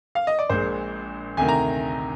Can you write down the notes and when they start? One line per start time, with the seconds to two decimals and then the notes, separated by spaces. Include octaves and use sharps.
0.15 F5
0.27 D#5
0.39 D5
0.50 A#1 A#2 G#3 C5
1.37 D2 C3 D#3 G#5
1.49 A#5